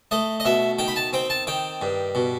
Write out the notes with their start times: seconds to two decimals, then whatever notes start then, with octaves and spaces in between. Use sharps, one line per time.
0.11 A3 D#5
0.40 D#5
0.45 B2 E5
0.79 D#3 G5
0.88 B5
0.96 A5
1.13 C4 G5
1.30 A5
1.47 D#3 G5
1.81 G2
2.15 B2